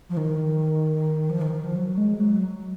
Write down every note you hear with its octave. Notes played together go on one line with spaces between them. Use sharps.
F3
D#3
F3
D#3
D#3
F3
F#3
G#3
F#3